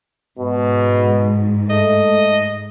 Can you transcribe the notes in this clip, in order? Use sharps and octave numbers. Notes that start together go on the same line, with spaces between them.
G#2 B2
A3 D#5